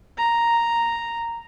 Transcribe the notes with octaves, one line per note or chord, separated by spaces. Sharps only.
A#5